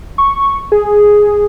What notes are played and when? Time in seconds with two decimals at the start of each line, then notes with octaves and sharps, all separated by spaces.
0.18 C#6
0.72 G#4